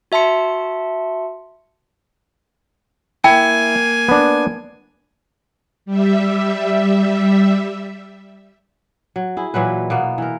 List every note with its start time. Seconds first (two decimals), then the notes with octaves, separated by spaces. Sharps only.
0.12 F#4 E5 A5 C6 C#7
3.24 A#3 E4 G5 G#5
4.09 B3 D4
5.86 G3 E5
9.16 F#3
9.37 E4 G#4
9.54 A#2 E3 F#3 B4
9.90 B2 A#3 B3
10.18 E3 A#4